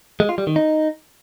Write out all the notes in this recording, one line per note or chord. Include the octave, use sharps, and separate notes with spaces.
G#3
F4
G3
D#3
D#4